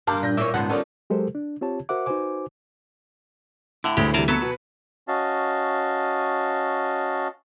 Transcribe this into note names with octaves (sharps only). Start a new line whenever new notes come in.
G2 A#3 G4 A#4 F5 A5 C6 G6
A#2 G6 A#6
E3 A#3 C#4 E5 D6
C#2 G#2 B3 F#5 A5 C6
D#3 F3 G3 B3 C#4 A4 A#4
F#3 G#3 G4 A4 A#4 C5
D4
C4 F4 G4 C#5 A5
F#4 A#4 C5 E5 F#5 D6
D#4 F#4 B4 C5 G#5 D6
A2 D3 E4
G1 D2 A2 G#3 G4
C3 E3 G3 G#4 A#4 A5
F#3 B3 A4 A5 B6 C#7
B2 B4
C#4 F#4 D#5 F5 A5